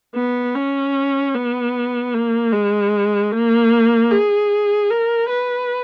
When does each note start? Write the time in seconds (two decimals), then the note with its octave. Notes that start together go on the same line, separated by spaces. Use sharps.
0.15 B3
0.55 C#4
1.34 B3
2.14 A#3
2.53 G#3
3.32 A#3
4.11 G#4
4.90 A#4
5.30 B4